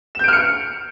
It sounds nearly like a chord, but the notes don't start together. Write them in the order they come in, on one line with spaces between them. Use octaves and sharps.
E7 G6 D7 F6 C#7